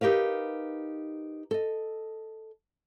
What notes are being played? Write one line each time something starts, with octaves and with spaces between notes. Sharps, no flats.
D#4 G4 A#4 B4 F5
A4 D#5